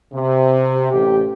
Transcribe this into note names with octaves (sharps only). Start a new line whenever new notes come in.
C3
A1 G4 G5